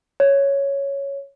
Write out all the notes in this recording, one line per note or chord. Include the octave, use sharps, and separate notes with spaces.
C#5